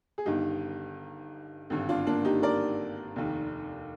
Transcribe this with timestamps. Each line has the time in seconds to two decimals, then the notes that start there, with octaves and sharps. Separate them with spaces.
0.18 G#4
0.26 G1 G2 D#3 D#4 G4
1.70 G#1 G2 D3
1.89 D4 F4
2.06 A#3 D4
2.25 D#4 G4
2.43 A#4 D5
3.16 F1 D#2 D#3